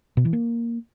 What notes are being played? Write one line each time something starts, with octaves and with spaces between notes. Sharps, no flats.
B2
E3
A#3